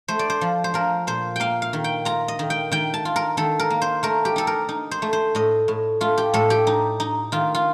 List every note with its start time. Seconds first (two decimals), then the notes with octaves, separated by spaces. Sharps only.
0.08 A3 C5
0.19 D5
0.30 C5
0.41 F3
0.64 C5
0.74 F3 A#4
1.07 A#2 C5
1.36 A#3 F5 G5
1.62 F5
1.73 D#3
1.84 G5
2.05 F4 A#5
2.28 D#5
2.39 D#3
2.50 G5
2.72 D#3 G5
2.94 A5
3.05 F4
3.16 A#4
3.37 D#3 A4
3.59 A#4
3.70 A#3
3.82 C5
4.03 A3 A#4
4.25 G4
4.36 D#4 A4
4.47 A#4
4.69 D#4
4.91 C5
5.02 A3
5.13 C5
5.35 A2 D#5
5.68 A2
6.01 A3 F4
6.18 G4
6.34 A2 A4
6.50 G4
6.67 D#4
7.00 D#4
7.32 D#3 F4
7.55 F4